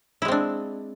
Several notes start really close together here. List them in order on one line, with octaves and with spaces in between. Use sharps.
E4 G#3 C4 D4